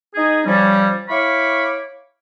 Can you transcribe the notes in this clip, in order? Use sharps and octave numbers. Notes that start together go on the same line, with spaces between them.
D#4 G#4
F3 G3 C#4
E4 C#5 F5 B5 C#6 D6